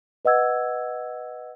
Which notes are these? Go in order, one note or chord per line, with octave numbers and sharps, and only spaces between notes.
B4 D#5 F#5 E6 G#6